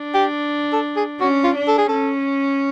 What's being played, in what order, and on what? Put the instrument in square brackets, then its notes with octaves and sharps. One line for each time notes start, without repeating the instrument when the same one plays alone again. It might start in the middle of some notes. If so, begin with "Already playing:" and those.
Already playing: [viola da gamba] D4
[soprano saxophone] G4
A4
G#4
[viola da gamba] C#4 [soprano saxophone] F#4
[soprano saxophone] F4
[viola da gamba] D4
[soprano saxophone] A4
G#4
[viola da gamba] C#4 [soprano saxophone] A4